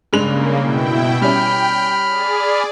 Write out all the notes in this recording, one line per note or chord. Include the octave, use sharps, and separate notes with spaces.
G2 C#3 G#3 A#3 F7
B2 E4 G5
G3 C#4 G5 B5 F6
G#4 D5